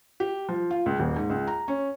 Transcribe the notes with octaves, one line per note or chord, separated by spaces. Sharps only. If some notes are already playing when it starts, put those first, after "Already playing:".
G4
F3
F4
C#2
D#1
G#2
C#2
A#5
C#4